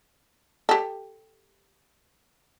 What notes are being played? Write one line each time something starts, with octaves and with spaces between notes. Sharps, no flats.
G4 A4